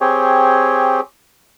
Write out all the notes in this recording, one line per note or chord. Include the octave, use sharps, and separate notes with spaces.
C4 G4 G#4 C#5